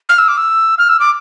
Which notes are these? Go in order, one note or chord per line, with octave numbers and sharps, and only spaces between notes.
F6
E6
D6
E6
F6
E6
D6